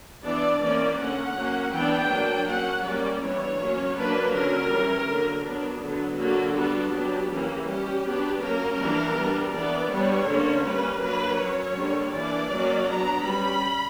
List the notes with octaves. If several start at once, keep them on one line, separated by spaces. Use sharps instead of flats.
E3 B3 D4 D5
E3 A#3 C#4 D5
D3 A#3 C#4 F#5
F#3 A#3 C#4
E3 B3 D4 G5
F#3 A#3 D4
F#3 A#3 C#4 F#5
G3 A#3 C#4 D5
E3 G3 B3 D4 C#5
F#3 A#3 C#4
F#3 A#3 D4 B4
D3 F#3 C#4 A#4
E3 G3 C#4
D3 F#3 A#3
F#3 B3 D4
D3 F#3 B3
D3 F#3 A#3 D4 F#4
G3 B3 D4
F#3 B3 D4 G4
E3 A#3 C#4
G3 C#4 G4
F#3 B3 D4
F#3 A#3 C#4 A#4
E3 G3 A#3 D4
G3 B3 D4
E3 B3 D4 D5
G3 B3 D4 C#5
D3 A#3 C#4
G3 A#3 C#4 B4
F#3 A#3 D4 B4
F#3 C#4 C#5
D3 G3 A#3
E3 A#3 D4 D5
F#3 A#3 C#4
F#3 B3 D4 A#5
G3 C#4 B5